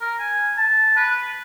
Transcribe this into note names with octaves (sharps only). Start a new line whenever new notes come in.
A#4
G#5
A5
B4